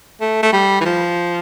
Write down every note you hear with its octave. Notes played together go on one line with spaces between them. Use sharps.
A3
A3
G3
E3
F3